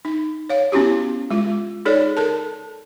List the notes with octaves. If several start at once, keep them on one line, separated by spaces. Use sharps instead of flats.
D#4
C#5 F5
B3 C#4 E4 F#4 G4
G#3 F4
D#4 G#4 A4 C#5 D5
A4 A#4 A5